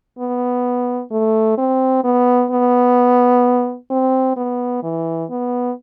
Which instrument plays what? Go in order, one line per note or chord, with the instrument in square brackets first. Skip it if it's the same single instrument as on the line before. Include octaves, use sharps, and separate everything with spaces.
[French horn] B3
A3
C4
B3
B3
C4
B3
E3
B3